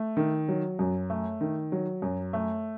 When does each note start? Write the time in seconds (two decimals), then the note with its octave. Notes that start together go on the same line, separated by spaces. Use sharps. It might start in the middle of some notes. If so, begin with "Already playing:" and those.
Already playing: A3
0.17 D#3
0.48 F#3
0.79 F#2
1.10 A3
1.41 D#3
1.72 F#3
2.02 F#2
2.33 A3